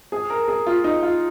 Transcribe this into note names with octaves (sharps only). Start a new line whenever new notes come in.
G#4
A#4
G#4
F4
D#4
F4